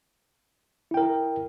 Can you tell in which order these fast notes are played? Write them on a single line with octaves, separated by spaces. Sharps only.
E4 G5 A#4